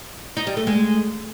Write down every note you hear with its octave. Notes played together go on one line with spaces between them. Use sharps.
D#4
G3
A3
G#3